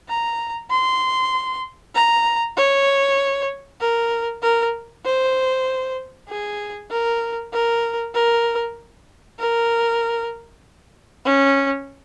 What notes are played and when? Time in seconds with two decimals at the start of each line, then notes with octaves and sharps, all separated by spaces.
0.09 A#5
0.70 C6
1.95 A#5
2.57 C#5
3.81 A#4
4.42 A#4
5.05 C5
6.29 G#4
6.91 A#4
7.53 A#4
8.15 A#4
9.39 A#4
11.25 C#4